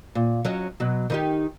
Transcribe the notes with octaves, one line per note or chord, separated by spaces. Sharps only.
A#2
F#3 C#4 D#5
B2 F#3
D#3 D#4 G4